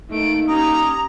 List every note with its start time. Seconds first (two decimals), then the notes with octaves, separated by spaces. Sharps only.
0.10 A3 A#3 D#4 D7
0.48 C#4 G4 A#5 D#6